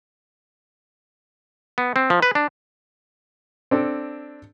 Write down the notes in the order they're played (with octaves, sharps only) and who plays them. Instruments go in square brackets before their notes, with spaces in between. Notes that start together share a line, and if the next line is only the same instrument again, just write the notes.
[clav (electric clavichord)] B3
C4
F3
B4
D4
[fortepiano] C4 D4 A4